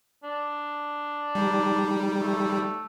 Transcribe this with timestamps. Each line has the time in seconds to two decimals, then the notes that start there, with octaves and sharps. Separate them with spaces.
0.24 D4
1.35 G3 D#4 D5 A#5
2.22 A3